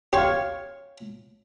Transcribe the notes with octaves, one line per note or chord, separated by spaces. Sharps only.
G4 C#5 F5 C6 C#6